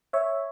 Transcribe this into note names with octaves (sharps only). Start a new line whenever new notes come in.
C#5 E5